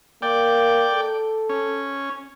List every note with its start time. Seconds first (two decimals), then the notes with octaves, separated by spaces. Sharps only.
0.22 A#3 D5 G5
0.93 A4
1.49 C#4